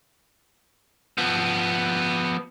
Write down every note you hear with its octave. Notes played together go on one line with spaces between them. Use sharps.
F3 B3